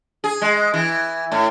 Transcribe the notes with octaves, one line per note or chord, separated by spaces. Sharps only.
G#4
G#3
E3
A2